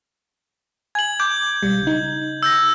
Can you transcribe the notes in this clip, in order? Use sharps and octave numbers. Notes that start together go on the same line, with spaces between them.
G#5 G#6 F#7
D6 G6
B1 G3
C#3 D#4
E6 G6 A#6